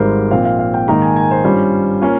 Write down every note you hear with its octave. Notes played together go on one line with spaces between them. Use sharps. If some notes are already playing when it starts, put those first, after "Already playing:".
Already playing: G#1 G#2 G3 A#4 C5
A#2 F3 C4 F5
F5
F5
G5
G#2 D#3 A#3 D#4 A#5
G#5
G#5
C5
G2 G3 C#4 F4
A#3 C#4 F4